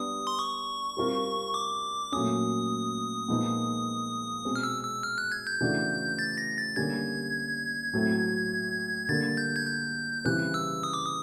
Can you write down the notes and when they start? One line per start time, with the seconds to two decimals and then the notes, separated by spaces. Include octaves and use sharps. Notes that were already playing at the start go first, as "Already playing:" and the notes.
Already playing: G3 B3 D4 D#6
0.27 C6
0.39 C#6
0.97 G3 C4 F4 A#4
1.54 D6
2.12 A#2 F#3 A3 C#4 D#6
3.28 A#2 F3 G#3 B3 D#4
4.45 B2 G#3 C4
4.56 F6
4.63 E6
4.84 E6
5.03 F6
5.18 F#6
5.32 G#6
5.47 G6
5.61 C#3 E3 A3 D4 F#4
6.19 A6
6.38 A#6
6.58 A6
6.76 D3 G3 A#3 C#4 G#6
7.93 A2 F#3 A3 C4
9.09 D3 G3 A#3 A6
9.37 G6
9.56 G#6
9.67 G6
10.25 C#3 E3 G3 C4 F#6
10.54 E6
10.83 D#6
10.94 D6
11.05 D#6